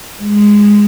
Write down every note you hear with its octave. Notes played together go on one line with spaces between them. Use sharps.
G#3